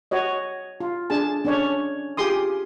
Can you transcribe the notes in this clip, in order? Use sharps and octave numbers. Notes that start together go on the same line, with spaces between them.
F#4 C#5 D#5
F4
D4 G#4 A5
C#4 D4 C#5
F4 G4 G#4 C6 D#6